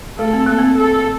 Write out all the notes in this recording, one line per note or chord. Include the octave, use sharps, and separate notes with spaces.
A3 A4
C4
A#3 A4
C4
A4